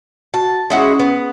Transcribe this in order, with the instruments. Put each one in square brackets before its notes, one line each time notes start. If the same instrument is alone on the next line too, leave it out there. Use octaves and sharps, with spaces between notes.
[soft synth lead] F#4 [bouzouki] A5
[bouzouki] G#3 E4 F#4 [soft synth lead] C#4
[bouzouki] B3